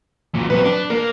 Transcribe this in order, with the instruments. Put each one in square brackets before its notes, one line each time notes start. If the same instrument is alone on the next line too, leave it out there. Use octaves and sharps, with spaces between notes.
[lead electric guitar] A#2 F#3
[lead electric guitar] F#3 C4 [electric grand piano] B4
[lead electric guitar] D4
[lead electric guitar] A#3 [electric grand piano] A#4